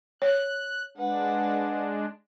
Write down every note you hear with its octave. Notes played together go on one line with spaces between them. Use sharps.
C#5 F#6
G#3 D4 B4 F#5